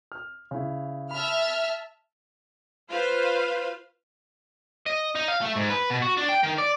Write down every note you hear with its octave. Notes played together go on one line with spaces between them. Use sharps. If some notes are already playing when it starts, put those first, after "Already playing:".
F6
C#3 E4
E5 A5 B5 F6
F4 B4 C5 F5
D#5
D#4
F5
A3
G#2
B4
B2
F#4
D4
G5
D#3
D5